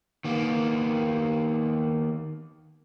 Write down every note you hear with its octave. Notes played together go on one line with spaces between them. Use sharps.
D#3 A#3 B3